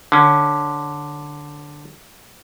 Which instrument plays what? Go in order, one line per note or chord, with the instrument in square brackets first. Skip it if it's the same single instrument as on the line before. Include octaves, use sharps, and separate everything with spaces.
[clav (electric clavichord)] D3 C#4